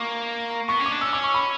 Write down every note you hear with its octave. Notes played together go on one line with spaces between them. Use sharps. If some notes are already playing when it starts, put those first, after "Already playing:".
Already playing: A#3 C#6 D6
B3 C#6
C#4
D6
D4
C#4 E6
D6
C#6
B5